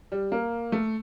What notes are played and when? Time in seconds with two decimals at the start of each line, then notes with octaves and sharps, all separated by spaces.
0.12 G3
0.32 A#3
0.72 A3